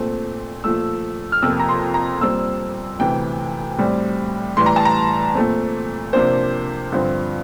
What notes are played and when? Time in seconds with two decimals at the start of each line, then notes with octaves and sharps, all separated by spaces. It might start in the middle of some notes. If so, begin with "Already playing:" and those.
Already playing: A#2 A3 C4
0.64 A#2 F3 A3 E6
1.32 F6
1.42 F2 C3 F3 A#3 E6
1.60 A#5
1.69 C6
1.94 A#5
2.21 A#2 G3 C4 E6
2.99 D2 C3 E3 G5
3.78 A2 G3 C4
4.57 A2 E3 G3 C6
4.66 A#5
4.76 A5
4.85 A#5
5.34 A#2 A3 C4
6.13 C3 F3 A#3 D4 C5
6.92 G2 D3 F3 C4